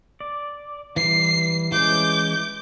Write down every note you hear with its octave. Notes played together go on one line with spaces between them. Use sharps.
D5
E3 G3 C7
E3 G#3 C#4 D6 G6